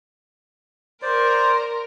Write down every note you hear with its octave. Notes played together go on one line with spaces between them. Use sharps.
A#4 C5 D5 C6